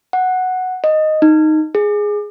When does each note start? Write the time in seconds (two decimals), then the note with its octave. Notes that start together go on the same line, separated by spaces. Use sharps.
0.13 F#5
0.84 D#5
1.22 D#4
1.75 G#4